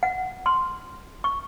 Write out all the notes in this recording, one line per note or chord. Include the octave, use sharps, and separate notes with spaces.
F#5
C6
C#6